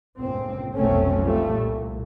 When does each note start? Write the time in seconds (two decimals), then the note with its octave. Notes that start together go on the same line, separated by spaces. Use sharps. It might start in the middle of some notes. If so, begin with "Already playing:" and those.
0.18 G1 C#2 A#2 C4
0.77 F1 B1 B2 A3 C4 C#4
1.22 F3 G3 A3
1.51 C2 A#2